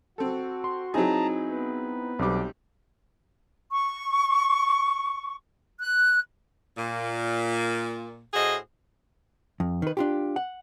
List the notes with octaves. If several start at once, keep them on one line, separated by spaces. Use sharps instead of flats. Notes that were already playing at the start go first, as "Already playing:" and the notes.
C4 F#4 A4
C6
F#3 C4 D#4 E4 G#4 A5 A#5
B3 B4
B1 G3 C4 D6
C#6
F#6
A#2
A2 F#4 G#4 C5 D#5
F2
D#3 B4
D4 F4 G4
F#5